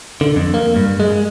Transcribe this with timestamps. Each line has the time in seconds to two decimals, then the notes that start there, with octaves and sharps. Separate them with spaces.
0.21 D3
0.36 F2
0.54 A#3
0.76 G2
1.00 G#3